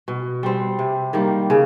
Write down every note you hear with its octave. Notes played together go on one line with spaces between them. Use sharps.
B2
G3 C4
C3
D#3 G3 A#3
C#3